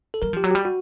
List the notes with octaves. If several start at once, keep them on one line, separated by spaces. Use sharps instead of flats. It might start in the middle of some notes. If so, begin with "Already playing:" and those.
A4
G3 A#4
F3 G4
F#3
G3 G4
F#4